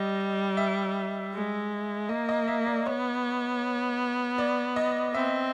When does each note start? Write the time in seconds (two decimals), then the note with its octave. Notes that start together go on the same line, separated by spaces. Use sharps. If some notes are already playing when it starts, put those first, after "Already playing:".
Already playing: G3 D#5
0.57 E5
1.34 G#3
2.09 A#3 D#5
2.29 D#5
2.48 E5
2.66 D5
2.86 B3 C#5
4.38 D5
4.76 D#5
5.14 C4 E5